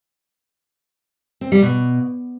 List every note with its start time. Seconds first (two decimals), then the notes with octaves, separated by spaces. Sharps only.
1.41 C4
1.52 G3
1.62 B2